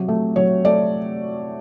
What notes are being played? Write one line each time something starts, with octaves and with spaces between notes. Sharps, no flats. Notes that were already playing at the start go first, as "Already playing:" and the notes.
Already playing: C3 F#3
A3
F#3 C#5
A3 D5